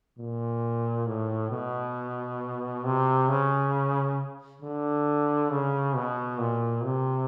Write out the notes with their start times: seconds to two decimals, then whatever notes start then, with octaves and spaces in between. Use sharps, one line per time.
0.18 A#2
1.07 A2
1.51 B2
2.85 C3
3.29 C#3
4.62 D3
5.51 C#3
5.95 B2
6.39 A#2
6.84 C3